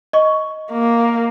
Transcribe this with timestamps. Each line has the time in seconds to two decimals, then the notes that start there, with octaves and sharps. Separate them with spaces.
0.13 D#5 C#6
0.71 A#3